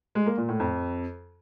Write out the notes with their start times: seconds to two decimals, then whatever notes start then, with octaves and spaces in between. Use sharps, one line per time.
0.15 G#3
0.26 A#3
0.37 A#2
0.49 A2
0.60 F2